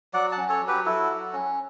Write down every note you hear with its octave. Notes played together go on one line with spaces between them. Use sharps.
F#3 D5 F#5
F#5 A5
C#4
A4 C#5
F#3
G4 B4
E4 F#4 A4
F#3
C#4